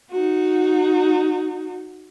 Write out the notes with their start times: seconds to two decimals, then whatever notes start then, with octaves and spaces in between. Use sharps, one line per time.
0.12 D#4 F#4